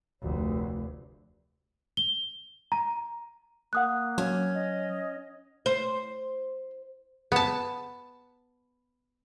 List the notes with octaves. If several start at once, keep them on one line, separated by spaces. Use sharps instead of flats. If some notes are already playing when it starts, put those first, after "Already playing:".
F1 D2
G7
A#5
A#3 F#5 D#6 F#6
F#3 C#4
D#5
C5
B3 A5